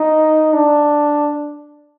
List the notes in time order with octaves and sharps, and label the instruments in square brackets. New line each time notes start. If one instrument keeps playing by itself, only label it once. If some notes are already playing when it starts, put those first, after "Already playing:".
Already playing: [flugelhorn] D#4
D4